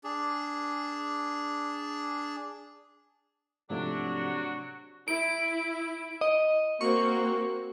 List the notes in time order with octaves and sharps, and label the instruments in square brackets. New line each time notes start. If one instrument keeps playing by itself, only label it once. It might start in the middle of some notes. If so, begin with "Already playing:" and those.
[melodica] D4 G#4
[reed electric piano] G#2 F3 A3 [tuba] C3 [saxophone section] F#3 D4 [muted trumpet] F#4
[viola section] E4 [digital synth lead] D7
[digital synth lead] D#5
[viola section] A#3 C4 F#4 [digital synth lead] C#6